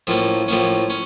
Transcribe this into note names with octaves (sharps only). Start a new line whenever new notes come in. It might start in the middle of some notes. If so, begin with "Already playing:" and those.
A2 F3 A#3 C#4
A2 F3 A#3 C#4
C#4